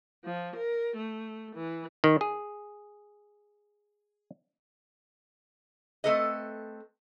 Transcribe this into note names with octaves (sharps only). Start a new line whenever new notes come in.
F3
A#4
A3
E3
D#3
G#4
A3 C4 A4 B4 D#5